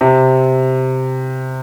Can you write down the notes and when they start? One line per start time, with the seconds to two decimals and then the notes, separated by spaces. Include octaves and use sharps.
0.01 C3